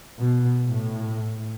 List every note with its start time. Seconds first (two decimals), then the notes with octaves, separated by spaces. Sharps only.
0.18 B2
0.65 A2